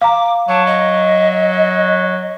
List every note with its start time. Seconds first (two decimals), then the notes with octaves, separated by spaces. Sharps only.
0.01 F5 A#5 D6
0.49 F#3 A5
0.67 D#5